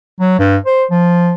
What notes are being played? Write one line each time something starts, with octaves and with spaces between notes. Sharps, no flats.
F#3
G2
C5
F3